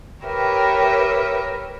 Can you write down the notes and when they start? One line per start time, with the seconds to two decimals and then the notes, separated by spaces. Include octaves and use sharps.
0.23 G4 A#4 B4 C#5 E5 G5